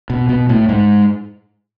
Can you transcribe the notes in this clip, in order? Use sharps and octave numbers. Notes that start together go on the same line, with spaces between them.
B2
B2
A2
G#2